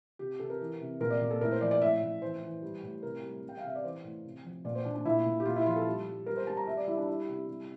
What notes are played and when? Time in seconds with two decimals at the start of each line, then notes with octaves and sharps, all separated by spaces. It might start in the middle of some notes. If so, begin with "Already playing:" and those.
0.19 C3 G4
0.40 C3 A4
0.50 A#4
0.60 E3
0.80 C3
1.00 A#2 A#4
1.10 D5
1.21 A#2
1.31 A4
1.41 A2 A#4
1.51 C5
1.61 F3 D5
1.71 D5
1.81 A2 E5
2.02 A2
2.22 E3 C5
2.42 E3
2.62 G3
2.83 A2
3.03 C3 A#4
3.23 G3
3.44 G3
3.49 G5
3.57 F5
3.64 C3 E5
3.75 D5
3.84 E3 C5
4.04 A2
4.25 C3
4.45 F3
4.65 A#2 D5
4.75 C5
4.85 A#2 D4
4.95 D4
5.05 A#2 E4
5.26 A#2
5.40 G4
5.45 A#2 F4
5.56 E4
5.66 F3 F4
5.76 A4
5.86 G3
6.06 G3
6.26 G3 A#4
6.37 C5
6.47 G3 A5
6.57 A#5
6.67 G3 E5
6.77 D5
6.87 G3 E4
6.97 D4
7.07 G3 E4
7.28 C3
7.48 G3